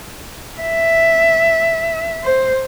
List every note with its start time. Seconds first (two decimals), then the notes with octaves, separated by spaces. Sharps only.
0.62 E5
2.24 C5